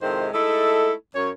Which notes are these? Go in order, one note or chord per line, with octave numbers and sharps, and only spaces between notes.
F2 C3 D#3 G#3 E4 C5
G#3 A3 D#4 E4 A4
F#2 C#5